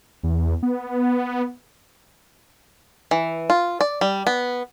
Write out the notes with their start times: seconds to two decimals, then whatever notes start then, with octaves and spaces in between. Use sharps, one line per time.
0.23 E2
0.63 B3
3.11 E3
3.50 F4
3.81 D5
4.01 G3
4.27 B3